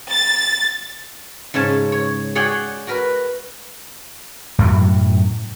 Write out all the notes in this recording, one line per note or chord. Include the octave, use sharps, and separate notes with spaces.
A6
G#2 C#3 C#5 A5
C#5
G#4 C#5 D5 F#5 G5
F#4 A#4 B4
F#2 A2 C3 F#3